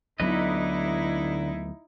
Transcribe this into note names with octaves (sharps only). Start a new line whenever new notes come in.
D2 D3 F#3 B3 D#4 E4 B4 D#5